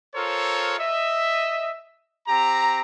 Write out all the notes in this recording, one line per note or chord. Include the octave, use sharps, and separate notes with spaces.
F4 A4 A#4 C5 C#5
D#5 E5
C4 G4 A#5